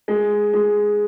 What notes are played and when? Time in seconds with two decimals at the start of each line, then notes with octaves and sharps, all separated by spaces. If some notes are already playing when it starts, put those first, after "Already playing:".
0.08 G#3
0.53 G#3